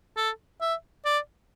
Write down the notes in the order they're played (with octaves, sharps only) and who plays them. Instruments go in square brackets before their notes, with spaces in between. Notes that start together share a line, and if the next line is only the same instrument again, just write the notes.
[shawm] A4
E5
D5